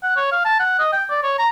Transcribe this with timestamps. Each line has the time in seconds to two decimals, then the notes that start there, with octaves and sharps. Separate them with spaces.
0.03 F#5
0.16 C#5
0.32 F5
0.45 A5
0.60 F#5
0.79 D#5
0.93 G5
1.10 D5
1.23 C#5
1.39 A#5